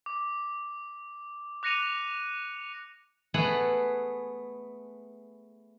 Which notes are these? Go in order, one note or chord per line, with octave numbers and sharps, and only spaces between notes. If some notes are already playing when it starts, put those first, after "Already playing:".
D6
D6 F#6 A#6 C#7 D#7 F7
A3 B3 G#4 B4 F#5 B5